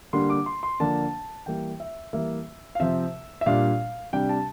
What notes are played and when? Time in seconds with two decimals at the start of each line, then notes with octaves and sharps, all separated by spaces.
0.13 D3 G3 A#3 D4 C6
0.30 D6
0.46 C6
0.63 C6
0.80 D3 F3 A#3 D4 A5
1.46 E3 G3 A#3 G5
1.80 E5
2.13 E3 G3 A#3 E5
2.75 F5
2.80 C3 F3 C4 E5
3.41 E5
3.46 A#2 G3 D4 F5
4.13 C3 G3 D4 G5
4.29 A5